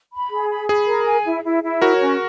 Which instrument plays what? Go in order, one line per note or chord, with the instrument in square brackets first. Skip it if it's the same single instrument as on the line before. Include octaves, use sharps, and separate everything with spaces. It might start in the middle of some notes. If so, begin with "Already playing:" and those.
[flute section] B5
G#4
B5
[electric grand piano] G#4 [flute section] B5
[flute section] A#4
G#5
E4
E4
E4
[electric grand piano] F#4 A#4 [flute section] C#5
[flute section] C#4